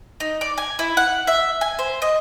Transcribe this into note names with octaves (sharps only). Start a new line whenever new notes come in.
D#4
D5
G#5
E4
F#5
E5
G#5
C5
D#5